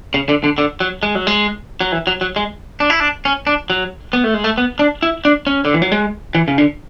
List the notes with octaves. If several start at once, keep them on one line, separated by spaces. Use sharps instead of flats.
C#3
D3
D3
D3
F#3
G#3
F#3
G#3
F#3
E3
F#3
F#3
G#3
D4
E4
D4
C#4
D4
F#3
B3
A3
G#3
A3
B3
D4
E4
D4
C#4
D3
E3
F#3
G#3
E3
C#3
D3